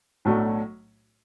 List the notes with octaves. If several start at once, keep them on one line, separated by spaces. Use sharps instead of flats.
B1 A2 F#3 A3 D4